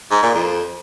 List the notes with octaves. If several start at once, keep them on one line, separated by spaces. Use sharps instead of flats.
G#2
A#2
F2